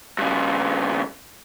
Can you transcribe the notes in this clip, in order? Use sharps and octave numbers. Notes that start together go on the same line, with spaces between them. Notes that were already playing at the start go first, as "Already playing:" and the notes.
G2 C#3